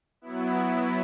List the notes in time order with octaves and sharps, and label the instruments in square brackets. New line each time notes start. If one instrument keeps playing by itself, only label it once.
[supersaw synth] F#3 B3 E4